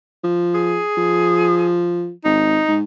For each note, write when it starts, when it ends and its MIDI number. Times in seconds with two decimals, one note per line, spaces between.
0.24 0.80 53
0.54 1.82 68
0.97 2.11 53
2.24 2.60 32
2.24 2.76 63
2.68 2.83 44